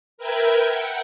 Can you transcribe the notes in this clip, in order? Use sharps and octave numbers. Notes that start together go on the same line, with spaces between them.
A#4 B4 E5 G5 G#6
F#5 G5